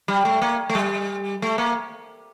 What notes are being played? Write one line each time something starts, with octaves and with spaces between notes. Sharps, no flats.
G3
A3
A#3
A3
G3
A3
A#3